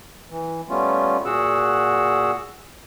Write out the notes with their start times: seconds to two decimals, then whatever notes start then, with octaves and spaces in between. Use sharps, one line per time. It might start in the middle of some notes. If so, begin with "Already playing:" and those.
0.31 E3
0.70 G3 A3 B3 C#4 F4
1.25 A#2 F#4 G#4 F#5 E6